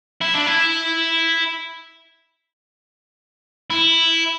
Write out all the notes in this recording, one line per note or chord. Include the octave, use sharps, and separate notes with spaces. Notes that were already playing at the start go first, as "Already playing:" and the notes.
E4
D4
E4
E4